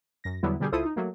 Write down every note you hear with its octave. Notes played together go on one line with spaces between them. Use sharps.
F#2 A#6
E2 D3 F#3 G3 B3 E4
B2 D3 G3 G4 G#4
C#2 E4 F4 A4 C5 D#6
D#4
F#3 A3 A#3